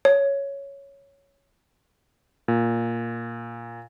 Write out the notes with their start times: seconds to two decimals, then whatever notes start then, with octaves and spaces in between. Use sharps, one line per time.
0.05 C#5
2.48 A#2